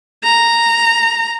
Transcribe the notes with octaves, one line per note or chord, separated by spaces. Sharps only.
A#5